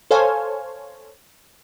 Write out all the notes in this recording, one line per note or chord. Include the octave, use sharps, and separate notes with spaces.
A4 C5 C#5 F5 G#5